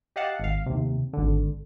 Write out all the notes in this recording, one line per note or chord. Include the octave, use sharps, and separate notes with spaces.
G4 D#5 F5 F#5 A5
G#1 F5
D#2 C3
G#1 D3